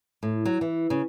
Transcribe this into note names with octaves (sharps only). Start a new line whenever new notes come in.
A2
F#3
E3
C#3